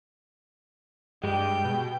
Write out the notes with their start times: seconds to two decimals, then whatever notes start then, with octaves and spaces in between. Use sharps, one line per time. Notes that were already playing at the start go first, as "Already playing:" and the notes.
1.24 G2 G#3 G4 G5
1.65 B2